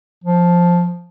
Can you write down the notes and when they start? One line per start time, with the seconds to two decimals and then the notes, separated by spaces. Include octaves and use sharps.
0.24 F3